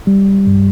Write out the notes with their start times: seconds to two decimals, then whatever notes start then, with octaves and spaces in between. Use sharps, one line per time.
0.07 G3
0.47 G2